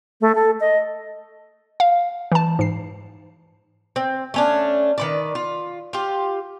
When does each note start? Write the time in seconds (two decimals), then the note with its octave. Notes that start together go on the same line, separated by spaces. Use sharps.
0.21 A3
0.35 A4
0.60 D#5
1.80 F5
2.32 E3 A5
2.59 G#2 C7
3.96 C4
4.34 A3 C#4 D4
4.98 D#3 B4 D5
5.35 F4
5.93 F4 G4